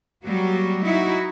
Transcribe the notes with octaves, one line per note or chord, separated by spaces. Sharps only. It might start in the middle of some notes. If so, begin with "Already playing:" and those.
F#3 G3 A#3 F#4
D#4 E4 F#4